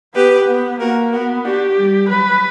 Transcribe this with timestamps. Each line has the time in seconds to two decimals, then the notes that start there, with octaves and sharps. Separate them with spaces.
0.15 B3 G4 B4
0.47 B3
0.80 A#3 F#4 A#4
1.12 B3 F#4 A#4
1.45 D4 F#4 G4
1.78 G3
2.10 F#3 B4